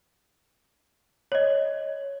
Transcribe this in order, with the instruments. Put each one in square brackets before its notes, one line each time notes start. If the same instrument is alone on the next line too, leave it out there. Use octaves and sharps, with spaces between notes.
[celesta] C#5 D#5